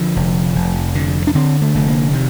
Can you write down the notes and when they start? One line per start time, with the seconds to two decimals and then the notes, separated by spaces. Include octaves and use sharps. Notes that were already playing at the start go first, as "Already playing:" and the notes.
Already playing: D3 F3
0.16 F1
0.56 F1
0.95 D3
1.27 D4
1.35 D3 C4
1.62 A3
1.75 F1 A3
1.88 A#3
2.13 C3 D#3